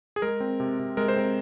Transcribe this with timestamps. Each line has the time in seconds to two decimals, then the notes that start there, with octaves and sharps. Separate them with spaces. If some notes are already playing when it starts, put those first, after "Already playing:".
0.16 G#4
0.22 G#3 A#4
0.40 C4
0.60 C3
0.79 C3
0.97 G#3 A#4
1.08 C5
1.17 C4 A#4